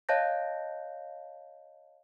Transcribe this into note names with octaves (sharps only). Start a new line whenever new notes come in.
C#5 D#5 F5 A5 G6 A#6